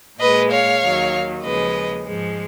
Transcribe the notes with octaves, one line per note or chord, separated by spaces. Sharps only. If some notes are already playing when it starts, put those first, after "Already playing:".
A#2 G#3 B4 D#5
C#5 F5
D#2 D#3 F#3
D#2 C#3 F3 G#3 B4 D#5
G#2 F3 G#3